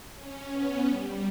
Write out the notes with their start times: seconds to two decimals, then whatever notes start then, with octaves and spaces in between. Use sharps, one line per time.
0.14 C#4
0.51 B3
0.87 G3